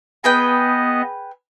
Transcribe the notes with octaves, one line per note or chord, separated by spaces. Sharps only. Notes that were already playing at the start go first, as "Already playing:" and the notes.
B3 G#4 B4 D#5 G5